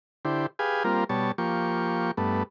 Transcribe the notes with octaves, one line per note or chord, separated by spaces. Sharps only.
D3 E4 G4 C5
G4 G#4 B4 F5 G#5
G3 A#3 C4 F4 A#4
B2 G3 C#5 A5
F3 A#3 G4 C#6
G2 A3 B3